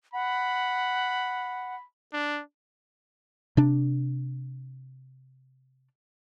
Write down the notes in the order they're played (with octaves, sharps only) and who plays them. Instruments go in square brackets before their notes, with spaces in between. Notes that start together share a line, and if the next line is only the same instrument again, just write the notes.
[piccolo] F#5 [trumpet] B5
[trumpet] D4
[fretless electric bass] C3 D4